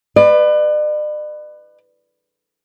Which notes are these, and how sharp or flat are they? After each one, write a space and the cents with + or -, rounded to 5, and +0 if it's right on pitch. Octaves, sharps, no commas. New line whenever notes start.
B4 +15 D5 +45